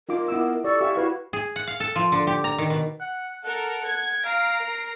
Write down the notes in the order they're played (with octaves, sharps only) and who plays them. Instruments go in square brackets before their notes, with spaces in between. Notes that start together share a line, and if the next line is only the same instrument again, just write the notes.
[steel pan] D#4 F4 D6 [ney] A#4
[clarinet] B3 [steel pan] E4 D6 E6
[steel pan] G4 D5 [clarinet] A4 [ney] C#6
[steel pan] G4 F5 G#5 [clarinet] E5
[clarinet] E4 [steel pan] F#4 B4 F5
[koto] G#4
F#5
F5
A4
F3
D3
G4
A#5
D#3
B2
[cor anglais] F#5
[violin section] A4 A#4 [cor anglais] F#5
[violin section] G#6
[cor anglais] F5 [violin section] A#5 C7 D7
[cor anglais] A#4